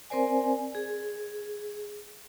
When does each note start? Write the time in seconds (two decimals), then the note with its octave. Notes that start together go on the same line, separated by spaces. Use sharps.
0.10 C4 A#4 C5 D5 G#5
0.75 G#4